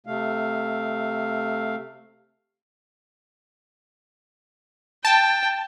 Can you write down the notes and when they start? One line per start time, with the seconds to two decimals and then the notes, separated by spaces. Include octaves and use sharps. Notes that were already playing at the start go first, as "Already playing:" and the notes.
0.06 C3 A3 F5
5.05 G5 A5